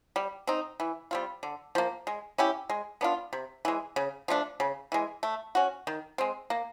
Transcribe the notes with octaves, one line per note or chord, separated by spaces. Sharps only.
G3
C4 D#4
E3
G3 C4 F4
D3
F3 A#3
G#3
C#4 E4 G4
G#3
B3 D4 F4
C3
E3 G#3
C#3
F3 A3 D4
C#3
E3 G#3
A3
C#4 F#4
D#3
G#3 C4
A#3